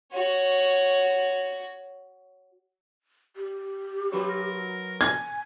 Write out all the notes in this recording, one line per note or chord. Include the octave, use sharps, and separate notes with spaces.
F#4 C#5
G4
F#3 B4 C#5
A#4
G#5 G#6